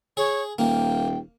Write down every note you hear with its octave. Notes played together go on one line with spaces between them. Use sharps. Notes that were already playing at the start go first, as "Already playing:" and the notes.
G#4 C#5
D#1 A#3 G5